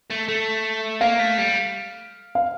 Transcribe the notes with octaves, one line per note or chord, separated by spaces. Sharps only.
A3
A3
A#3 F5
A3
G3
F5